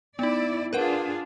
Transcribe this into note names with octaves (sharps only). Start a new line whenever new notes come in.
B3 D#4 E4 D5
D4 F4 G#4 A#4 B4 F#5